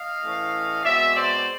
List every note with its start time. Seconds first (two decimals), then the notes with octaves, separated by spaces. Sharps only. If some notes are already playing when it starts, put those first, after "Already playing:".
Already playing: D#5 F5
0.22 A2 E3 A3 C#4
0.84 B2 G#3 C4 D5 E5
1.16 C5 D5